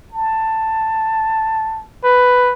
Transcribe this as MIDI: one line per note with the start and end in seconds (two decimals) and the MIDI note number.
0.12 1.84 81
2.04 2.53 71